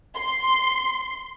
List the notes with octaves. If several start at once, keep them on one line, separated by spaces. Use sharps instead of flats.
C6